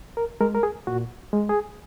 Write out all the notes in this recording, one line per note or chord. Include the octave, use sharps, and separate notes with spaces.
A#4
G#3 A#4
A#4
G#4
A#2 F#4
G#3
G#4